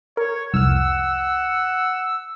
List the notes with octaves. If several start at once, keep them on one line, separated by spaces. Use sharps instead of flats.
A#4 C#5
C2 F2 F#5 E6 F6